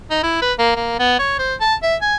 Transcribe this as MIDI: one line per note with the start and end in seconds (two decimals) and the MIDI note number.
0.11 0.19 63
0.23 0.37 64
0.42 0.53 71
0.59 0.72 58
0.76 0.95 58
0.99 1.18 59
1.19 1.35 73
1.39 1.55 72
1.61 1.75 81
1.83 1.96 76
2.01 2.16 80